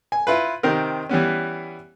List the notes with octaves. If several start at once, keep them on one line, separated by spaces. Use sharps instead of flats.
G#5
E4 F4 B4
C3 D#3 C4 A#4
E3 G3 B3 C#4